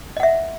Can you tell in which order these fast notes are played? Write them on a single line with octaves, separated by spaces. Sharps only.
D#5 F#5 E5